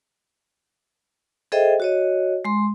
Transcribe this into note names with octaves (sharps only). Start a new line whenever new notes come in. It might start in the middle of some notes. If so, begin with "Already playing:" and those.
G#4 A4 C5 D#5 E5 G5
F#4 C#5 D#5
G#3 C6